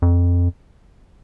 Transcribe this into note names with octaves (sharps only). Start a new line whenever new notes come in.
F2